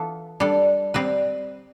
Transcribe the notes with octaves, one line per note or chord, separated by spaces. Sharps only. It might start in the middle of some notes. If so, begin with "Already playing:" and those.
Already playing: E3 B3 F4 A4
G3 D4 A4
G3 C4 G4 B4